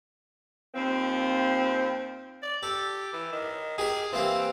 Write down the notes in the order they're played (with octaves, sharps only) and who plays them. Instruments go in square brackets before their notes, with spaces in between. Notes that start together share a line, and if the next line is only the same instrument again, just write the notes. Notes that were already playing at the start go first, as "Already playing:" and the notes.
[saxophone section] D#2 F3 C4
[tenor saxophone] D5
[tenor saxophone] G4 [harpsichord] A4
[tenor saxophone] E3
D#3
[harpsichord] G4 A#4 [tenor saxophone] G#4
[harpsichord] E3 A#3 G4 [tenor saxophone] C4